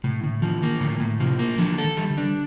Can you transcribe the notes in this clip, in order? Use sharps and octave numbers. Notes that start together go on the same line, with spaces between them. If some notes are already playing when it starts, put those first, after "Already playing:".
A2 C3
A2 D3
D#3 F3
D#3 A#3
A2 D3
A2
C3 F3
A#3
D3 F3
A4
D#3
G3
D3
D4